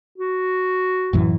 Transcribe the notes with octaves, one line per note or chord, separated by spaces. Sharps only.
F#4
A1 F#2 E3